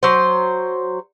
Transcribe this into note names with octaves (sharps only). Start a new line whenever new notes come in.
F#3 C5